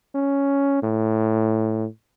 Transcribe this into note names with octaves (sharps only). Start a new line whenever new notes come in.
C#4
A2